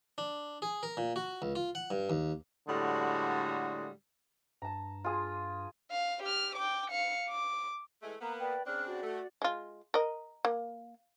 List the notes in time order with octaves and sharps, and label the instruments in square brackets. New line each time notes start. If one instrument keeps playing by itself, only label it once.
[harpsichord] D4
G#4
A#4
A#2
F#4
C#2
F4
F#5
G2
D#2
[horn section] A2 D3 G3 G#3 F#4
[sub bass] G2 [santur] A5 A#5
[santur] F4 G#4
[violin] F5
G4 F6
G5 D6
F5 C#7
D6
[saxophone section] E3 G#3 A3
[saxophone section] A#3 B3 [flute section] A#5
[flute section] B4 D5 G5
[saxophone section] C#3 C4 D4 [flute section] F6 F#6
[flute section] F#4 D5
[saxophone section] A3
[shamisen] G#3 F4
A#4 D#5
A#3